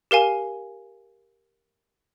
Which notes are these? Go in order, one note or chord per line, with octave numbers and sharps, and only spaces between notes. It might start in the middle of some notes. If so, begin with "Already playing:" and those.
G4 A#4 F5 G#5